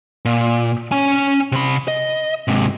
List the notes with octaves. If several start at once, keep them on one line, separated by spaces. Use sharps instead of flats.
A#2
C#4 G#5
C3 B5
D#5
G#2 C3